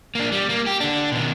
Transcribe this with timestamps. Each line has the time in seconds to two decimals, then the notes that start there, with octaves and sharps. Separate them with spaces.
0.15 A#3 D4
0.32 G3
0.49 A#3
0.67 G4
0.80 D3 D4
1.12 B2 D#3